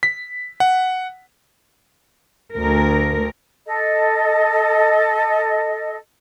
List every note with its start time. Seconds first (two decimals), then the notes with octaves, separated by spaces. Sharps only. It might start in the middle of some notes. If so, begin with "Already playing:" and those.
0.03 B6
0.60 F#5
2.54 D2 A#4
3.66 A4 D#5